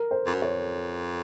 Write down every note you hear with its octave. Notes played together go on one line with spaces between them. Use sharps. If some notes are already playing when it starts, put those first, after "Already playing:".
Already playing: A#4
C5
F2
F#2
F2 C#5